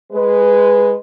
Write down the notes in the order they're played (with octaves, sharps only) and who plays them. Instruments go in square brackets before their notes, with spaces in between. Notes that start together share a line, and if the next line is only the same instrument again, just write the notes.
[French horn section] G#3 B4